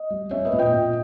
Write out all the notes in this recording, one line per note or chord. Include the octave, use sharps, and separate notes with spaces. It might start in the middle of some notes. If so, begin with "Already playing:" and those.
Already playing: D#5
G3
C#4 C#5 E5
B4 D#5
A#2
D#5 G5
A#2